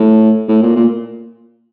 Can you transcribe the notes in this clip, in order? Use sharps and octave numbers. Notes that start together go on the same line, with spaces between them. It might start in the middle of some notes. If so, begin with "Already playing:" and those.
Already playing: A2
A2
A#2
A#2